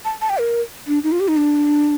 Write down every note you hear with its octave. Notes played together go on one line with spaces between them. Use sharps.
A5
A5
G5
A#4
D4
D#4
F4
G4
D#4
D4